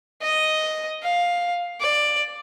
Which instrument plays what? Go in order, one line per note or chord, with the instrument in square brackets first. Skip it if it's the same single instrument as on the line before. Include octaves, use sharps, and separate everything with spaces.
[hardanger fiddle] D#5
F5
D5